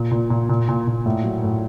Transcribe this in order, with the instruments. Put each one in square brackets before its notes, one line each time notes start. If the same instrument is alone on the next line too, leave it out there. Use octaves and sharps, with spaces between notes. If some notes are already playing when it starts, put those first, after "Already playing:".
Already playing: [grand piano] A#2
A#2
A#2
A#2
A#2
A#2
A2
F#3
A2